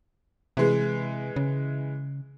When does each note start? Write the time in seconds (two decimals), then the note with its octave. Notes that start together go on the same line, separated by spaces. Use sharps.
0.57 C3 E3 G#3
1.36 C#3